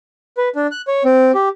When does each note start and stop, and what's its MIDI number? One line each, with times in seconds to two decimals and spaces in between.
0.38 0.49 71
0.56 0.67 62
0.72 0.82 90
0.88 1.03 73
1.05 1.32 60
1.35 1.49 67